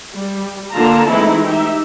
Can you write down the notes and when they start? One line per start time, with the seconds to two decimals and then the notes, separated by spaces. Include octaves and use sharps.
0.15 G3
0.72 D3 A#3 F4 A5 A#5
1.08 E3 G#3 A3 C4 D#4 E4
1.46 D#4 G4 E5